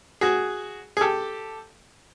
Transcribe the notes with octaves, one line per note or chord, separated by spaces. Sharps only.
F#4 G#4
G#4
G4 A4